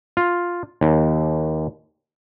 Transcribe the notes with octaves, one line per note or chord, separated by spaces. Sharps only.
F4
D#2